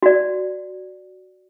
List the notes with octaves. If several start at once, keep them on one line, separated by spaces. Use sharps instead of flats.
F#4 D5